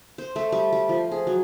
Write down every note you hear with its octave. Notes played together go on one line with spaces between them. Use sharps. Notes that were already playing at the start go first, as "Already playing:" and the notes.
C5
A3
G3
G3
F3
G#4
F#3